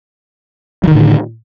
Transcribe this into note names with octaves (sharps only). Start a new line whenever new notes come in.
A2 D3 D#3 F#3